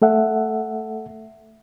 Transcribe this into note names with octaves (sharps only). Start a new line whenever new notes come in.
A3 A4 E5 F#5